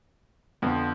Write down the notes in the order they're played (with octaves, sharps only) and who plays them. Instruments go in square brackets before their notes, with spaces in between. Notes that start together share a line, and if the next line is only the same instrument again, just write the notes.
[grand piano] F2 D3 F3 B3